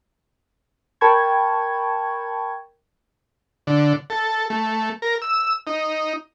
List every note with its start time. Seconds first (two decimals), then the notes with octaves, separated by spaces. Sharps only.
1.01 A#4 G5 A5 B5 C#6 G#6
3.67 D3
4.10 A4
4.50 A3
5.02 A#4
5.22 E6
5.67 D#4